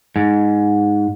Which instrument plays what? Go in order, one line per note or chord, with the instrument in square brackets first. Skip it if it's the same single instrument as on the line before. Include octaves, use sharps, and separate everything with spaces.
[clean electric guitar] G#2